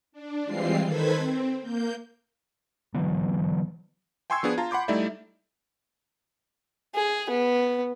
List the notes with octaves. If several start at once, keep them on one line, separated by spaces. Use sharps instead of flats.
D4
E3 G3 G#3 C4 F4 C7
D#3 A4 B4 C5 G#6 B6
C4
A#3 G6
D3 E3 F#3 B3
G5 G#5 C6 C#6 E6 G#6
F3 B3 D4 G#4
F4 A5 A#5
F#5 B5 C6 D6 G6
G3 A3 D#4 E4 D5 E5
G#4
B3